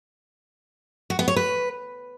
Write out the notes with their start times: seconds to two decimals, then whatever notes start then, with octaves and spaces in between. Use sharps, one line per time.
1.10 F#4
1.19 B3
1.28 C#5
1.36 B4